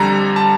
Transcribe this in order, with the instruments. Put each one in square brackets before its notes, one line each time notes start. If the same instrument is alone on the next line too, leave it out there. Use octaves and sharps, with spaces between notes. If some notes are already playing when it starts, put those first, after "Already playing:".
Already playing: [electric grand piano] F2 D3 G3 A#5
A5